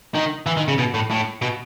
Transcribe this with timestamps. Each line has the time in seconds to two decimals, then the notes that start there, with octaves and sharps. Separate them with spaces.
0.15 D#3
0.46 E3
0.57 D#3
0.68 C#3
0.78 B2
0.94 A2
1.10 A2
1.42 B2